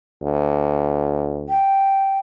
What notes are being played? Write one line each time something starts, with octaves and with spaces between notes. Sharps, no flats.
D2
G5